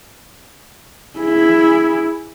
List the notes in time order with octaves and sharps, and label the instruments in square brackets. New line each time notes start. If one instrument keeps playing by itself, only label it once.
[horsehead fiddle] E4 G#4